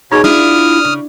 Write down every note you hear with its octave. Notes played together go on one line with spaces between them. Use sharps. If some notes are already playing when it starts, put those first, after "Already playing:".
B2 D#4 F#4 G#4 C#5
D4 E4 F4 D#6 F6
C#3